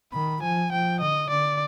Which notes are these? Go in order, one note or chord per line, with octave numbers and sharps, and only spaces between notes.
D#3 B5
F3 G#5
F3 G5
D3 D#5
D3 D5